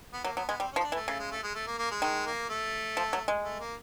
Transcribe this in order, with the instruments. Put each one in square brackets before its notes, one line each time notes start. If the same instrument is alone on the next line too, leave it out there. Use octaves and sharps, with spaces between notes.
[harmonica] B3
[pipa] F#3 [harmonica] A#3
[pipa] F#3 [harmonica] B3
[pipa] G#3 [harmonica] B3
[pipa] G3 [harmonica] C4
[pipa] F3 [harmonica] C#4
[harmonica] D#4
D4
[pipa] E3
[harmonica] A3
[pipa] C#3 [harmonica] A3
[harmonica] G#3
A3
G#3
A3
A#3
A#3
G#3
[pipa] D#3 [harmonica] G#3
[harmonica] A#3
A3
[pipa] F3
F#3
G#3
[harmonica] A3
A#3